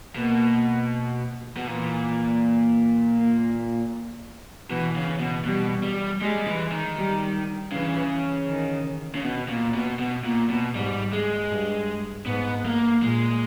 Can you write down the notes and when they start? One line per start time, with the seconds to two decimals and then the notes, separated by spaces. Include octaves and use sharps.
0.15 B2 A#3
1.57 B2
1.67 A#2 E3
3.18 A#3
4.70 B2 E3
4.96 C#3
5.20 B2
5.45 B2 G3
5.84 G3
6.21 G3 G#3
6.47 E3
6.72 D#3
6.97 G3
7.73 C#3 E3
8.48 D#3
9.15 C#3
9.24 B2
9.49 A#2
9.75 B2
9.99 B2
10.24 A#2
10.50 B2
10.76 G#2 G3
11.13 G#3
11.51 G2
12.26 G#2 B3
12.65 A#3
13.02 A#2 G#3